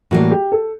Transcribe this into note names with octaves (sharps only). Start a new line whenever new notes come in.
A2 E3 G3 A#3 F#4
G4
A4